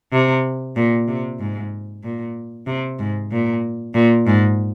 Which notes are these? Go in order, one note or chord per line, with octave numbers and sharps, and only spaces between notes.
C3
A#2
C3
G#2
A#2
C3
G#2
A#2
A#2
G#2